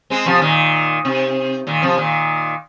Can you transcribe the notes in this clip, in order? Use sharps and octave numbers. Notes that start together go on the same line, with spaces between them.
G#3 C4
C3 F3
A#2 D#3
C3
A#2 D#3
C3 F3
A#2 D#3